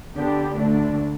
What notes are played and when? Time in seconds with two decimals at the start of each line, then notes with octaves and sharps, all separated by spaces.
0.15 D3 B3 D4 G4
0.56 D2 D3 A3 D4